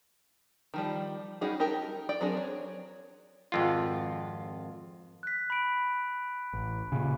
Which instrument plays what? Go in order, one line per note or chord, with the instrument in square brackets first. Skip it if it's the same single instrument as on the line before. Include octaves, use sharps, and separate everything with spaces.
[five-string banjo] D#3 F3 G3
G3 C#4 D#4 F#4 G#4
D#4 G4 A4 A#4
D5 G5
F#3 C4 D4 G#4 A#4
C#5
[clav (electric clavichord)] G#1 F2 F4
[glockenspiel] F#6 B6
B5 D7
[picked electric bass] A1
A#2 C#3